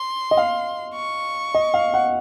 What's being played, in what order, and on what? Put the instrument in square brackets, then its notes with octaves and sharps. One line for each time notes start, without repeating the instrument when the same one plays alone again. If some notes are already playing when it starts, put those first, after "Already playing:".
Already playing: [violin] C6
[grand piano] D#5
F5
[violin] C#6
[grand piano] D#5
F5
F#5